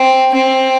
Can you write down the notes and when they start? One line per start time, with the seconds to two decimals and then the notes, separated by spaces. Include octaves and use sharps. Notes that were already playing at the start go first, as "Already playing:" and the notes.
Already playing: C4
0.33 C4